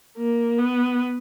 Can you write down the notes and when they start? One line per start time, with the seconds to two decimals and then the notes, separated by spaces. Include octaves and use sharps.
0.17 A#3
0.58 B3